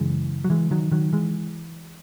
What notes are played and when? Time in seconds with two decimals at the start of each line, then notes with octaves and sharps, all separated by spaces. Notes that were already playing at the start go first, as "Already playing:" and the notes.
Already playing: F#2 C#3 E3 G#3
0.45 F#3
0.50 E3 G#3
0.71 D#3 F#3
0.91 D#3 F#3
1.13 E3 G#3